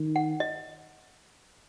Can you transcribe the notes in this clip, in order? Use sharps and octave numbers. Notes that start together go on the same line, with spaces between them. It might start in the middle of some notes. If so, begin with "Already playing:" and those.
Already playing: D#3
F#5
D#5